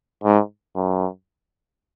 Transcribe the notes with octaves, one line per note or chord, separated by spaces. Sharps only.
G#2
F#2